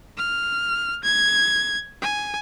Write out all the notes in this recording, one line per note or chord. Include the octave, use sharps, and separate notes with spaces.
F6
G#6
G#5